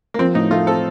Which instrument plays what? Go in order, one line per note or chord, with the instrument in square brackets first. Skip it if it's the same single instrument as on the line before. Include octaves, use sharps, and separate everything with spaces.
[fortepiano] A#3
[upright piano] F3 [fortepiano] C4
[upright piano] A2 [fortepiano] D#4
[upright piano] A3 [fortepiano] F4
[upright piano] C4 [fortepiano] A4